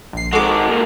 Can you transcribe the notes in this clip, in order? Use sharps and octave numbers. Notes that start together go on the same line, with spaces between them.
A#1 C7
D#3 G#3 F#4 A4 D6
B2 A#3